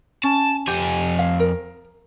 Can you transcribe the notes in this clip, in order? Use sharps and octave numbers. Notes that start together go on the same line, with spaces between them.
C#4 A5
F2 G4 G#5
F5
A#4